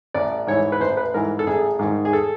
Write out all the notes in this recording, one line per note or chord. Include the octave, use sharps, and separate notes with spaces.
A1 D5
G#2 E3 C#5
B4
A1 C5
B4
G#2 E3 A#4
A4
A1 G#4
G#2 D#3
G#4
A4